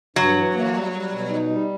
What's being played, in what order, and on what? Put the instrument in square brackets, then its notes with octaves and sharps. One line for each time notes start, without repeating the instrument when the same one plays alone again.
[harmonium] G2 [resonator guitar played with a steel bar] F#3
[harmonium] E3
A#3
G3
G3
B2
D#4
G3